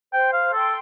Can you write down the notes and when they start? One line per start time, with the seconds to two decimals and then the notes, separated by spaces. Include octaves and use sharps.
0.13 C5 G5
0.33 F5
0.53 A4 G5 C6